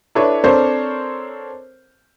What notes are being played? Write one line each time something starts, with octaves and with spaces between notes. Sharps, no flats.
D4 E4 A4 B4 C#5
C4 D4 A4 A#4 C5 C#5